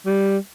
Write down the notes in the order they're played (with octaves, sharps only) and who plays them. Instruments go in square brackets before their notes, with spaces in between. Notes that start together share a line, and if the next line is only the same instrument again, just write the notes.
[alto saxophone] G3